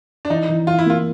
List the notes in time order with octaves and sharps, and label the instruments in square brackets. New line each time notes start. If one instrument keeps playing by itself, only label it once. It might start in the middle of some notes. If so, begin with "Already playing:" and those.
[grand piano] D4
[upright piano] E3 [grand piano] D#4
[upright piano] E3
[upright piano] E3 [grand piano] F4
[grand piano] E4
[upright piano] A#3 [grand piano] F4